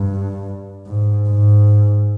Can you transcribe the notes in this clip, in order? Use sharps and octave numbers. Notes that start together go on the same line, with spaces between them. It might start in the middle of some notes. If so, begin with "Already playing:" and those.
Already playing: G2
G#2
G#2